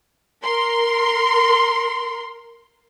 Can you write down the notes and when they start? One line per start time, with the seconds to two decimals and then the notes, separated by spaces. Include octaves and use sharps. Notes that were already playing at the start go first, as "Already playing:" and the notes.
0.43 A#4 C6